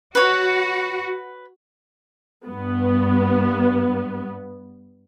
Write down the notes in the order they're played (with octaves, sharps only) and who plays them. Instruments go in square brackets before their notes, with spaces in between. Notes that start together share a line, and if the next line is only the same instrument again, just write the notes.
[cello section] F#4 [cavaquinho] B4 C#5
[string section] G2 B3